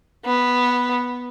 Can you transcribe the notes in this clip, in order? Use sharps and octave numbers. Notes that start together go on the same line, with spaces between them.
B3